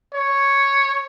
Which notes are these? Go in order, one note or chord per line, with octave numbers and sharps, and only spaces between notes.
C#5